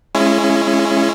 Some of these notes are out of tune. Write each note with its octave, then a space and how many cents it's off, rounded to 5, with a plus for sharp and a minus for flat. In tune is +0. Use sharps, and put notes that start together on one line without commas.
G#3 +15 C#4 -10 E4 +35